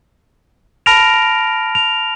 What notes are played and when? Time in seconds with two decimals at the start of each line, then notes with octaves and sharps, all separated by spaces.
0.86 A5 B5 F6 A#6 D7 F7
1.75 F7